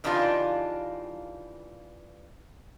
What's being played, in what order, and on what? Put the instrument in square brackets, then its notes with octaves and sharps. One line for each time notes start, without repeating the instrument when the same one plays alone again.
[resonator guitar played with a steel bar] C#3 E3 D4 D#4 F4 G4